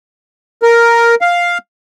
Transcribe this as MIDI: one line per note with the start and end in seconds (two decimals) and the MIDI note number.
0.63 1.15 70
1.21 1.58 77